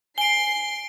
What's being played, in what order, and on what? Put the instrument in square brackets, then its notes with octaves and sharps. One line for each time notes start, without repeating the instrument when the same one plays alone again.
[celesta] G#5 [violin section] C7 [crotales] D7 G7